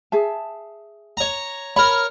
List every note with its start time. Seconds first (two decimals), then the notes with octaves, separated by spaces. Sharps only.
0.12 G#4 E5 A5
1.17 C#5 A#5
1.76 A#4 C#5 B5